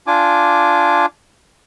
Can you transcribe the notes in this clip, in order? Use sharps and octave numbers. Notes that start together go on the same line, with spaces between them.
D4 F4 G#5 D6